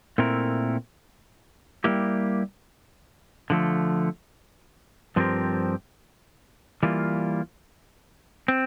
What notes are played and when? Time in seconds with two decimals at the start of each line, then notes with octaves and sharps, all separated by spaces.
0.18 A#2 A3 C4 E4 A#4
1.84 G3 A#3 E4 G4
3.50 D3 F3 A3
5.16 G2 F3 C4 G4 A#4
6.83 E3 G3 A#3 F4
8.48 C4